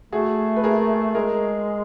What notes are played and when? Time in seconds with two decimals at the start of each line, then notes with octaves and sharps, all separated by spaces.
0.12 A3 F#4 G#4
0.56 B4
0.64 G#4 A#4
1.15 G#3 G#4 A#4